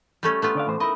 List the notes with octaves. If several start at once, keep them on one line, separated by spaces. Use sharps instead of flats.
G3 A3 C#4
A3 B3 F4
D3 D5 F5
A2 E3 C5
D#4 E4 A#4 D#5